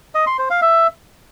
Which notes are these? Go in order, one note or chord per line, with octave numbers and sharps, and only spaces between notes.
D#5
C6
C5
F5
E5